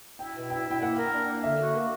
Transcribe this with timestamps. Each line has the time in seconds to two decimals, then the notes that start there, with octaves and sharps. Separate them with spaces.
0.19 E4 G5
0.35 B2
0.50 E4 G5
0.67 E4 G5
0.81 A#3 F#5
0.97 A#4
1.13 D4
1.28 A#3
1.43 D3 E5
1.59 F#4
1.75 A#3